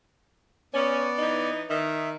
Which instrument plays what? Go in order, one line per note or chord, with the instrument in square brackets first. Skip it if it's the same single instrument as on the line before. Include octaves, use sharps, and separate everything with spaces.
[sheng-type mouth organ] B3 D5 [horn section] C#4
[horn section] E3 D#4
[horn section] D#3 [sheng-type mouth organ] E5